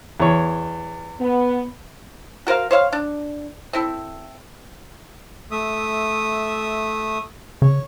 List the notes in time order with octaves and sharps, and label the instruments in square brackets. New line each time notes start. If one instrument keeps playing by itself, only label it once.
[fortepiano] E2 C#5
[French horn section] B3
[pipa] F#4 A#4 C5 F5
C5 C#5 E5 F5
D4
C4 E4 A4
[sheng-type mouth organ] A3 E5 D#6
[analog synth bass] C#3 [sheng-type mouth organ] C#5